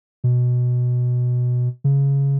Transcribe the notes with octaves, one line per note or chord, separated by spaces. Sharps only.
B2
C#3